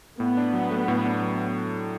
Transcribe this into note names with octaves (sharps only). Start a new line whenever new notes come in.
A2 B3
D4
F#3
A3
A2
D4
F#3